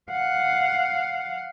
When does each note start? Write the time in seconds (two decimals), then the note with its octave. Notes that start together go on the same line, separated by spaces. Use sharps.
0.11 F5 F#5